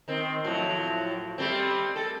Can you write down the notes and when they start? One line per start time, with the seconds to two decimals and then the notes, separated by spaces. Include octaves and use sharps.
0.08 D#3 C4
0.44 A2 F3 F#3
1.38 G3 A3 C4
1.96 A4